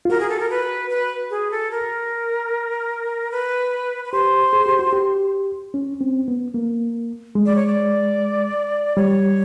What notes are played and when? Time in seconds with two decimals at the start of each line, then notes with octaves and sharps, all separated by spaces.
0.05 F4
0.10 F#4 A#4
0.20 G#4
0.30 A4
0.39 A#4
0.50 B4
0.90 B4
1.30 G#4
1.51 A4
1.71 A#4
3.32 B4
4.05 B4
4.12 G4 C5
4.53 G#4
4.66 G4
4.79 F#4
4.93 G4
5.74 C#4
6.01 C4
6.28 B3
6.54 A#3
7.35 G#3
7.46 D5
7.56 C#5
7.67 D5
8.96 G3 C#5